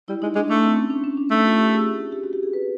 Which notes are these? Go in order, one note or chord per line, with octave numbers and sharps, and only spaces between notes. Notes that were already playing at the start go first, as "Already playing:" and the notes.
G3 E4
G#3 D#4
G#3 D4
A3 D4
C4
C#4
D4
C#4
D4
A3 D#4
F4
G4
G#4
G4
F#4
G4
G#4
B4